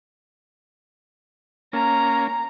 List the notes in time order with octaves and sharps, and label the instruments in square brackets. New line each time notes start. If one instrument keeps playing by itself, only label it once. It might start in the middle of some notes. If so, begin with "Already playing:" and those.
[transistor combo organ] A#3 C#4 [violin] A#5